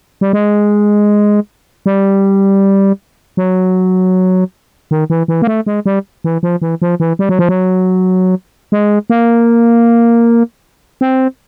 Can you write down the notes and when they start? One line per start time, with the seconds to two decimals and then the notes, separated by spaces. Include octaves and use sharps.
0.21 G3
0.33 G#3
1.86 G3
3.37 F#3
4.91 D#3
5.10 E3
5.28 E3
5.42 A#3
5.47 A3
5.66 G#3
5.86 G3
6.24 E3
6.43 F3
6.62 E3
6.82 F3
7.00 E3
7.19 G3
7.29 F#3
7.39 F3
7.49 F#3
8.72 G#3
9.10 A#3
11.01 C4